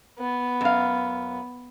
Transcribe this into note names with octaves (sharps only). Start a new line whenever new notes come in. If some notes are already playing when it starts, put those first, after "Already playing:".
B3
F#2 F5